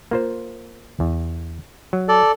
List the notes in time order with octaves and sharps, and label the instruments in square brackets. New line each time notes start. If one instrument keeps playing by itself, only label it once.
[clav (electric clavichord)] A#3 F4 C5
E2
F#3
[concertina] A4 D5